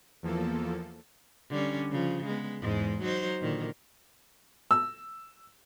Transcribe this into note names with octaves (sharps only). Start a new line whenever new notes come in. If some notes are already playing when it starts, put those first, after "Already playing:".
E2 F3 A#3 A4
D3 G3 C#4
C#3 F3
G#3 B3
E2 G#2 G#3
F#3 D#4 C5
A#2 D3 D#3
E6